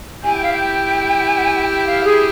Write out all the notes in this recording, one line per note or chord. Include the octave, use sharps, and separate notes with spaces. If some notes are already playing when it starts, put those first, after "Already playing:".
E4 G4 G#5
G5
F5
G5
G5
F5
G#4